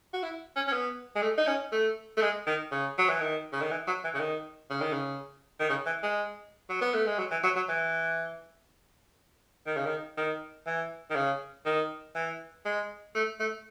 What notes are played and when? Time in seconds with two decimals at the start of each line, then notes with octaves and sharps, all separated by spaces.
0.13 F#4
0.23 E4
0.56 C#4
0.67 C#4
0.72 B3
1.15 G#3
1.22 A3
1.38 D#4
1.47 C#4
1.72 A3
2.17 A3
2.22 G#3
2.47 D#3
2.71 C#3
2.98 F#3
3.09 E3
3.20 D#3
3.53 C#3
3.62 D#3
3.71 E3
3.87 F#3
4.04 E3
4.15 C#3
4.20 D#3
4.70 C#3
4.81 D#3
4.93 C#3
5.60 D#3
5.69 C#3
5.86 E3
6.03 G#3
6.69 F#3
6.81 B3
6.94 A3
7.06 G#3
7.18 F#3
7.31 E3
7.43 F#3
7.56 F#3
7.68 E3
9.67 D#3
9.77 C#3
9.86 D#3
10.17 D#3
10.67 E3
11.10 D#3
11.16 C#3
11.66 D#3
12.15 E3
12.65 G#3
13.15 A3
13.40 A3